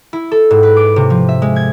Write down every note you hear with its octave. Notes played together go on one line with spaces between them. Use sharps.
E4
A4
G#2
B4
D6
C3
F3
E5
G#3
G#6